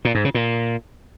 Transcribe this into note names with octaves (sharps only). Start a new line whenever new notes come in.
A#2
G#2
C#3
A#2